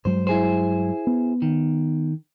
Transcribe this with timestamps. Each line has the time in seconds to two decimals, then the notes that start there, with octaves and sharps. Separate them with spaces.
0.05 G2 F#3 G#3 C5
0.27 E4 G#4 C5
1.07 B3
1.42 D#3